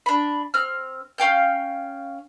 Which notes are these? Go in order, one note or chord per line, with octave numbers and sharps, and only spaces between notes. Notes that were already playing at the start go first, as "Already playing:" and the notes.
D4 B5
C4 F6
C#4 F5 G5 G6